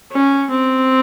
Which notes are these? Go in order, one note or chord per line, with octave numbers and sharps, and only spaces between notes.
C#4
C4